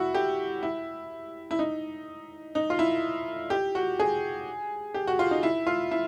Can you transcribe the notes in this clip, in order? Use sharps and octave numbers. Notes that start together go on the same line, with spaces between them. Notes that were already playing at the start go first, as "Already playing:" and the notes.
Already playing: E4 F#4
G4
E4
E4
D#4
D#4
F4
E4
G4
F#4
G#4
G4
F#4
F4
D#4
E4
F4
E4